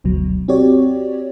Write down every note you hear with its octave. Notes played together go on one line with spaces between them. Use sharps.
G1 D2 B2 F#3
C4 F#4 G4 C#5 D5